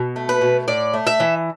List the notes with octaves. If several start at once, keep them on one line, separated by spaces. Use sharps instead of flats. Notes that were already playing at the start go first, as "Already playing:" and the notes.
Already playing: B2
A3
B4
B2
A2 D5
A3
E5
E3